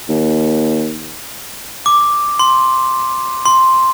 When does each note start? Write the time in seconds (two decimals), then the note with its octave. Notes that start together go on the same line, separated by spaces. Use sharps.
0.09 D#2
1.86 D6
2.39 C6
3.46 C6